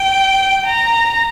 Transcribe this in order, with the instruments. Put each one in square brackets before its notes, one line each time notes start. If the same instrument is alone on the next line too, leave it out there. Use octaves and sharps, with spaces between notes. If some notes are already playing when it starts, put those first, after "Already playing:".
Already playing: [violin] G5
A#5